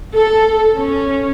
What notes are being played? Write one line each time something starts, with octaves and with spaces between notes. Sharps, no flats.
A4
C#4